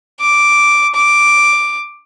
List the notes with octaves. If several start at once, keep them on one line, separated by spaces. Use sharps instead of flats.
D6
D6